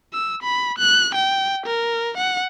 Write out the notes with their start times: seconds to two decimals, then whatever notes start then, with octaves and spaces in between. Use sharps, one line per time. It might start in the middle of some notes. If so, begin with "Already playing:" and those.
0.13 E6
0.43 B5
0.78 F#6
1.15 G5
1.66 A#4
2.18 F#5